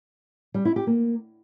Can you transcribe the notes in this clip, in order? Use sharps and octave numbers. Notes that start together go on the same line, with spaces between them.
G3
E4
G4
A#3